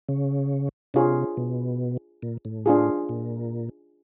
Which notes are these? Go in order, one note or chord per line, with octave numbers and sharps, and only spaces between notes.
C#3
C3 D4 F4 G#4 C#5
B2
A#2
A2
D4 F4 G#4
A#2